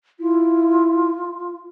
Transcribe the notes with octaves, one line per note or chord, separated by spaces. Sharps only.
E4 F4